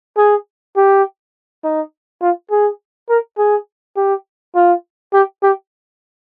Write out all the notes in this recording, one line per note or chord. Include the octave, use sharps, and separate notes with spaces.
G#4
G4
D#4
F4
G#4
A#4
G#4
G4
F4
G4
G4